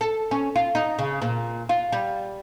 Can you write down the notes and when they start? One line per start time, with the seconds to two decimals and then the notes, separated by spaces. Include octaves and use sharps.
0.01 A4
0.31 C#4
0.56 F4
0.75 D#4
0.99 C#3
1.22 A#2
1.69 F4
1.92 G3